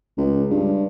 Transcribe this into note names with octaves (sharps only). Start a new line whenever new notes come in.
C#2
G2